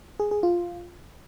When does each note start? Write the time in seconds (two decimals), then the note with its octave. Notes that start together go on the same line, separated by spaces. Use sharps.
0.20 G#4
0.31 G#4
0.43 F4